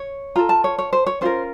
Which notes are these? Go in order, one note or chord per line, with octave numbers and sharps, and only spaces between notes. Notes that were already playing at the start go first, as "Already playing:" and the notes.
Already playing: C#5
F4 A4 A#5
A5
C#5
C#5
C5
C#5
C#4 F4 A#4 C5